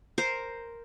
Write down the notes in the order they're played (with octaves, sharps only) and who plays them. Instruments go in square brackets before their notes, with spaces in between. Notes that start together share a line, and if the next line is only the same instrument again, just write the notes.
[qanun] A#4 C5